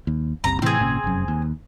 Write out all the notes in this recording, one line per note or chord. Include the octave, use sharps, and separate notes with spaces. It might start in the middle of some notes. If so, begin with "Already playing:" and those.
D#2
F#1 C2 C3 A#5
A2 C3 E3 C4 G#4
G#1 A#2 C#3
F1 F#2
D#2